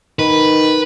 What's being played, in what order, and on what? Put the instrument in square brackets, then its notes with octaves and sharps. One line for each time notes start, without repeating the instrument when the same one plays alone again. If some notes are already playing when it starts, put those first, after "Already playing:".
[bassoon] D#3 [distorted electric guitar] B4